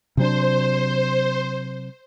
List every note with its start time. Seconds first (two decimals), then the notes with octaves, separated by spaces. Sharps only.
0.17 C3 F#3 D4 C5